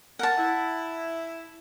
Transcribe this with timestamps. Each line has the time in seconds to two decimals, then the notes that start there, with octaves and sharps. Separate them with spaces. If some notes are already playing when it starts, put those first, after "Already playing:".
0.19 A#4 F#5 A5
0.37 E4